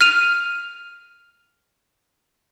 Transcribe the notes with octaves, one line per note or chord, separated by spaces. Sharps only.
F6 D#7 F7